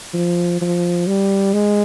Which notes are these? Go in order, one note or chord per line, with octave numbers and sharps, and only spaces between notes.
F3
F3
G3
G#3